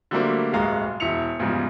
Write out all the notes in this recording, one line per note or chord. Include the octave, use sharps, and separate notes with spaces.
D3 F#3 G3 A3 A#3 C4
D1 C2 G2 G#3 F5 A#5
E1 E4 C#7 F7
E2 G#2 C#3 F3 G3